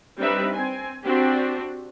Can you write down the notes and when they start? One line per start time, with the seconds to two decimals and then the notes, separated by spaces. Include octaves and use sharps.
0.19 G3 C4 D4 D#4 B4 E5
0.54 C4 G#5
1.04 C4 D4 F#4 G4